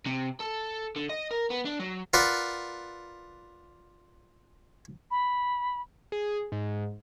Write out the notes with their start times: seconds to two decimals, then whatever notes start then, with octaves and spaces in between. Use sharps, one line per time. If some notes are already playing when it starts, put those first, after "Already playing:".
0.06 C3
0.40 A4
0.96 D3
1.10 D#5
1.31 A#4
1.51 B3
1.66 D4
1.80 F#3
2.13 F4 A#4 B4 D5 F#5
5.11 B5
6.12 G#4
6.52 G#2